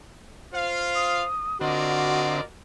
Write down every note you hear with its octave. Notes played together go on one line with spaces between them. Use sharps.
F4 C5 F5
D#6
D3 C4 F4 F#4 A#4 D5 D#5